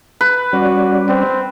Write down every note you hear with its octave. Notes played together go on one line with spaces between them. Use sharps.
B4
G3 C#4 F#4 D5
C4